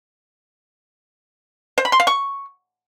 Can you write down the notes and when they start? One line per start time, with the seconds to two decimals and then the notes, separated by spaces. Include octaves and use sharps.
1.78 C5
1.85 B5
1.92 C6
2.00 F5
2.07 C#6